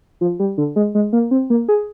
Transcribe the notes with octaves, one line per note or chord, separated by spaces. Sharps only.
F3
G3
D3
G#3
G#3
A#3
C4
A#3
G#4